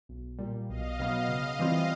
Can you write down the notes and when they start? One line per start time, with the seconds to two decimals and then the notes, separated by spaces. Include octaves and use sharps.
0.09 B1
0.39 A#2 G3
0.69 B1 D#5 F5
1.00 B2 F#3 B3
1.29 C#3
1.59 E3 G3 C4 F4